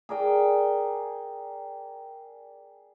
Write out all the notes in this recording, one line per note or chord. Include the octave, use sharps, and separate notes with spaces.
G#4 A#4 D5 G5